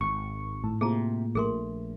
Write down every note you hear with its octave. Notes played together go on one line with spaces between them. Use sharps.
G#1 C#6
A2 A5
C3 A#3 F4 G#4 A5 A#5
A#1 A3 G#4 A#4 C6